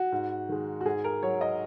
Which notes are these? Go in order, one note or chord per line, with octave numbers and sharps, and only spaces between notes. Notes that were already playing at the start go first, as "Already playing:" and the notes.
Already playing: F#4
G#2
D#3 G#3
F#4
G#2 G#4
A#4
F#3 C#5
D#5